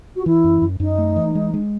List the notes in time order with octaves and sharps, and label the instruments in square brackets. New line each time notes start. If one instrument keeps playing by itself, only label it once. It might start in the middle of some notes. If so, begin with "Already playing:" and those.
[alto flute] F#4
[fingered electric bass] E3 [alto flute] E4
[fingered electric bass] F#2
F#2
[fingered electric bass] F#2 [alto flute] D#4
[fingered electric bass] A3
E3
G#3
G#3